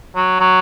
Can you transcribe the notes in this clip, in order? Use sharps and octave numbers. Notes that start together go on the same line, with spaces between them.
F#3
F#3